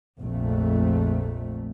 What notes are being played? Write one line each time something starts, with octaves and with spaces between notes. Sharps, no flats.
A#1 F2 A3